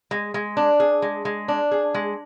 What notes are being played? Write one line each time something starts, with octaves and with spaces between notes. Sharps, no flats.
G#3
G#3
D4
G#4
G#3
G#3
D4
G#4
G#3